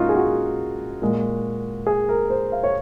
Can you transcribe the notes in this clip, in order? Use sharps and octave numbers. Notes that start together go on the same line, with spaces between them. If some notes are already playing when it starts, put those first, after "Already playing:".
Already playing: A#2 G#3 C#4 D#4 F4 F#4
G#4
F#4
A#2 G#3
G#4
A#4
C5
F5
C#5